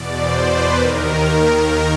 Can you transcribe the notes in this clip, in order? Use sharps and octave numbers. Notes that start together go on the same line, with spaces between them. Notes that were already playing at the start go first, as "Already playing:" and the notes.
Already playing: E2 B2 D5
C5
B4
D#2 D#3 A#4